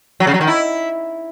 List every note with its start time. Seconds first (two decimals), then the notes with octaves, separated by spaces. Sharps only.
0.20 F#3
0.27 C#3
0.34 F#3
0.41 D#3
0.47 E4